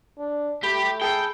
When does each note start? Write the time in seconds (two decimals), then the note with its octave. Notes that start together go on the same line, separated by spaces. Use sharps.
0.18 D4
0.63 A3 G4 B5
1.02 G#4 A4 G5